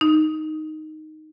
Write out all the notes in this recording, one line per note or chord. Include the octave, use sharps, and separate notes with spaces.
D#4